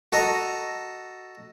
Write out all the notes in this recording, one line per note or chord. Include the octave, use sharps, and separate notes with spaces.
F#4 A4 D#5 A#5